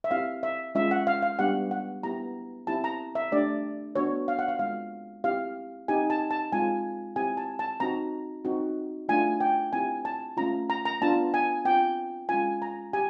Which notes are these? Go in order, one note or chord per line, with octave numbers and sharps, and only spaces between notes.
E5
C4 E4 G4 F5
E5
G#3 C#4 F4 E5
F#5
F5
F5
G3 B3 D4 G4 F#5
F#5
B3 E4 G4 A#5
C4 E4 G4 A5
A#5
E5
A3 D4 G4 D5
B3 D4 F#4 C#5
F5
F#5
F5
G#3 C4 F4 F5
C4 E4 G4 F5
C4 D#4 G4 G#5
A5
A5
G#3 C4 F4 G#5
C4 E4 G4 G#5
A5
A5
C4 D#4 F#4 A#5
C4 D#4 F#4
A3 D4 F4 G#5
G5
C4 E4 G4 G#5
A5
A3 C#4 F4 A#5
A#5
A#5
B3 D4 F4 A5
G#5
C4 F4 G5
G#3 C#4 F4 G#5
A#5
G4 G#5